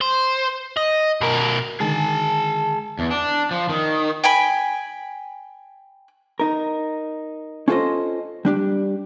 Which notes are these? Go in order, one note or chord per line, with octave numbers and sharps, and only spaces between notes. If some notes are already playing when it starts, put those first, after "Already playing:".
C5
D#5
B2 A#4
D3 D#3 G#3 G#4 G#5 A5
E2
D4
F3
D#3
G5 G#5 B5
D#4 A#4
C#4 F4 A4 C5 D#5
G3 D4 G4